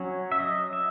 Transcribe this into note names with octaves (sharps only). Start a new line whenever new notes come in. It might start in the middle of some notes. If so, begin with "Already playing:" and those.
Already playing: F#3 C#4
E5
D#5
E5